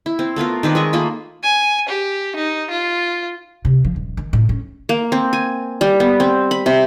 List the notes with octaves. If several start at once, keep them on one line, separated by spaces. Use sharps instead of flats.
E4
C4
A3 B3 F4 A#4
D#3 C4 B4 D5
G#3 A#4 D#5 C#6
A3 A#3 F4 B5
G#5
G4
D#4
F4
C3
F3
D#1
D#3
A2
C#4
A#3
C4
G#5
G3
B3
C4
B5
C3